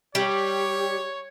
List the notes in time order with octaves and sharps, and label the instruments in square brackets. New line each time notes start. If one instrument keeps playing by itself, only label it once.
[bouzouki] G3 [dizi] G4 [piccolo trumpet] C#5